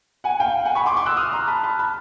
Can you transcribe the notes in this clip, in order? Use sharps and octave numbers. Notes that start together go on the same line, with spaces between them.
F#5 G#5
F5 G5
F#5 G#5
B5 C#6
C6 D6
C6 D6
E6 F#6
D#6 F6
A#5 C6
A5 B5
A5 B5
A5 B5